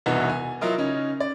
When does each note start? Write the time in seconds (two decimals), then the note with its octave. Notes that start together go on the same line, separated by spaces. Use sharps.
0.06 E1 C2 E3 B3 D#4 F#4
0.30 G#5
0.61 F#3 E4 F4 A#4 D#5
0.78 C#3 C#4 D#4
1.20 D5